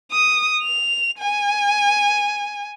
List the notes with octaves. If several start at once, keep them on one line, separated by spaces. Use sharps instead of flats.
D#6
F7
G#5